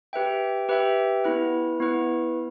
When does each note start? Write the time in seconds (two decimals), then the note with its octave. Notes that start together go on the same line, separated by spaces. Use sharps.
0.13 G4 B4 E5 G5
0.69 G4 B4 E5 G5
1.24 B3 E4 B4
1.80 B3 E4 B4